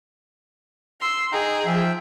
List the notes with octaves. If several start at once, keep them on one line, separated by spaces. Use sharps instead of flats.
C6 E6
D#4 G#4 G5 A#5
F3 E5 G5